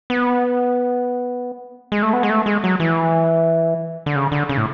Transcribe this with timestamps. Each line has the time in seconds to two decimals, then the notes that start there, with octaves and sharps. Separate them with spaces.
0.10 B3
1.92 G#3
2.03 A3
2.13 B3
2.23 G#3
2.30 A3
2.46 G#3
2.64 F#3
2.80 E3
4.06 D3
4.16 C#3
4.32 D3
4.49 C#3
4.57 A2